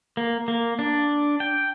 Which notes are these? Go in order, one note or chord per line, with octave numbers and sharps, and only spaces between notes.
A#3
A#3
D4
G5